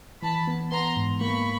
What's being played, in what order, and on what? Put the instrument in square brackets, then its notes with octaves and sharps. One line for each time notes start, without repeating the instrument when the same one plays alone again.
[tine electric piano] E3 [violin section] A5 B5
[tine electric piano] B3
[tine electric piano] B3 [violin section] A#5 C6
[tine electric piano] G#2
[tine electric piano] A#3 [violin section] B5 C#6